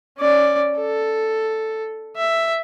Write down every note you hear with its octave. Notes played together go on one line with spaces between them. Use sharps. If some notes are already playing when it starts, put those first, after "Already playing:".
C#4 D5
A4
E5